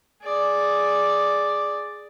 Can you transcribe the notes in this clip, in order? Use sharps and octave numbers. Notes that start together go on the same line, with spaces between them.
G#4 D5